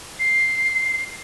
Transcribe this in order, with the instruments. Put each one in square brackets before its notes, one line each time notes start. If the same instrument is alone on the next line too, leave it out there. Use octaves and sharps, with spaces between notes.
[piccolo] C7